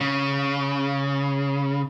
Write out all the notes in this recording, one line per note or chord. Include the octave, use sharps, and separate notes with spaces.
C#3